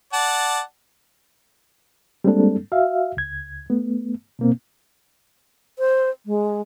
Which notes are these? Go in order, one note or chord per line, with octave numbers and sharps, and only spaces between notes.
D5 F#5 A5
G3 G#3 A#3 C4 D4 A4
F#4 E5 F5
C#2 G#6
A3 B3
B2 A#3 C4
C5
G#3